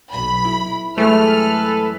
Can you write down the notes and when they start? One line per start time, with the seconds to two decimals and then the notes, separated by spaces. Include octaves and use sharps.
0.12 B1 B5
0.44 E4
0.98 F#2 E3 G#3 A3 A4 B4 F6